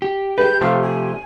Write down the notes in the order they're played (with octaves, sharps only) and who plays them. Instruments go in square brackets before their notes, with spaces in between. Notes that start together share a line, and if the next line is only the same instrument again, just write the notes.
[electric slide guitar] G4
[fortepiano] B4 [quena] G6
[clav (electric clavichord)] C3 F3 A3 [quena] F5
[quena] G#5